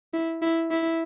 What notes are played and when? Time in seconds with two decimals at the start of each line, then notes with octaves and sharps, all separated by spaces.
0.14 E4
0.42 E4
0.71 E4